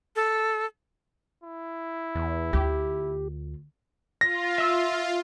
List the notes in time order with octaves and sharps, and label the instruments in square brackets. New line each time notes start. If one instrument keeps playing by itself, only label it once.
[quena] A4
[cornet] E4
[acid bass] E2
[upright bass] D2 F4 [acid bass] G4
[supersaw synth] F4 [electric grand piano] A#6
[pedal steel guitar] E5 E6